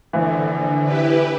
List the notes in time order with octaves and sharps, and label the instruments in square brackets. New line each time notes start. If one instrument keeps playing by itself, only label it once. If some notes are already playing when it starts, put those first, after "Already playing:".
[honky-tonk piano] A#1 E3 [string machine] D3
[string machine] E4 G4 B4